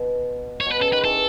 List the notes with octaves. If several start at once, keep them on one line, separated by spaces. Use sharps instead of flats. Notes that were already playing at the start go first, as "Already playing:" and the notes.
Already playing: B2
C#5
B2
B4
C#3 A4
D#3 B4
E3 A4